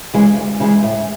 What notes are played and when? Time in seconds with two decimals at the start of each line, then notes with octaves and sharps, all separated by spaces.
0.14 C#3 E3 G#3
0.36 D2
0.60 C#3 E3 G#3
0.83 A2